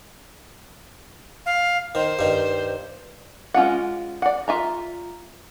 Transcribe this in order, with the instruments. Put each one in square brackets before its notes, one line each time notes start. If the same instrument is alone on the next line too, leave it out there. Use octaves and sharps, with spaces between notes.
[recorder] F5
[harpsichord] D#3 [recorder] C5
[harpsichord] G2 D#3
[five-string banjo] G#3 C#4 F4 F#5
D5 F#5
F4 E5 A#5